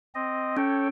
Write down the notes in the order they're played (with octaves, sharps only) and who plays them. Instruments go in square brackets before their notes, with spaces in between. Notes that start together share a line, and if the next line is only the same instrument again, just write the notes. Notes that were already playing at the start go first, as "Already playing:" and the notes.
[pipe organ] C4 D#5
[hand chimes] C#4 [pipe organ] A4 C#5 G5